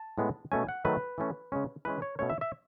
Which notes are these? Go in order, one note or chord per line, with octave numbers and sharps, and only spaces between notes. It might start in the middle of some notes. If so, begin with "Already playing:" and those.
Already playing: A5
A2 G#3 B3
B2 A3 C#4 G#5
F#5
D#3 F#3 A3 B4
E3 A3 C#4
C#3 G#3 C#4
E3 G#3 C#4 B4
C#5
B2 A3 C#4 C#5
E5
E5